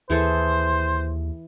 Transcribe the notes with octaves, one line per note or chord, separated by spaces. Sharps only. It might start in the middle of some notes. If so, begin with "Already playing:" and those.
D#2 E3 G#4 A4 C5